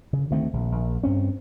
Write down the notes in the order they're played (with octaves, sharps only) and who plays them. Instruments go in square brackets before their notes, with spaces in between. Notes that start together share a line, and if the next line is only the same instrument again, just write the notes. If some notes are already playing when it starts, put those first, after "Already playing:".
[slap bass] C#3
D2 D#3 A3 C4
A#1
A#1
G2 C4 C#4